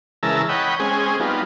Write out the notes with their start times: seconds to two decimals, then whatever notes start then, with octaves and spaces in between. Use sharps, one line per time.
0.23 C#3 E3 G#3 A#4 A5 E6
0.49 C#5 D#5 F#5 G5 B5
0.79 G#3 C4 C#4 G#4
1.20 G3 B3 D#4 F4